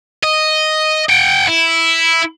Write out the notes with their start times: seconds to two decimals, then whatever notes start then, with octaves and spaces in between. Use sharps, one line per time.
0.24 D#5
1.09 F#5 G5
1.47 E4